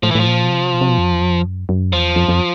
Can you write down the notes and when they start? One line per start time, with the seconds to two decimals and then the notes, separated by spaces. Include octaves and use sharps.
0.03 A2 F3
0.11 E3
0.15 A2 F3
0.27 A#2
0.44 B2
0.50 C3
0.74 B2
0.81 C3
0.89 B2
0.98 F2
1.13 E2
1.21 F2
1.45 F#2
1.69 F#2
1.92 E2 F3
2.16 F2
2.28 F2